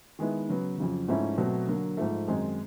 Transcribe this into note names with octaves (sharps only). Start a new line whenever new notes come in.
D#3 G#3 B3 E4
C#3 F#3 B3
F2 C#3 F#3
G#2 F3 A3 C#4 E4
B2 F#3 A3 C4
D3 F#3 A#3
G#2 F3 A3
F#2 D#3 G#3 C4 D#4